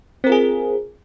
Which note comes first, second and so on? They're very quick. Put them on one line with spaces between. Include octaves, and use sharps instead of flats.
C4 A#4 F4 G#4